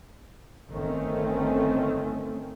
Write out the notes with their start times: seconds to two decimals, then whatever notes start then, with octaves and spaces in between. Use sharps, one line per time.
0.70 G1 D#3 A3 C4 C#4